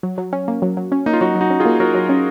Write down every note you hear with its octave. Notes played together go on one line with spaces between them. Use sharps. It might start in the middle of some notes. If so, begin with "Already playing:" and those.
F#3
F#3
C#4
A#3
F#3
F#3
C#4
A#3 D#4
F4
F#3 D#4 F#4
F#3
D#4 F#4
C#4
F4 G#4
A#3
F#3 F#4 A#4
F#3
C#4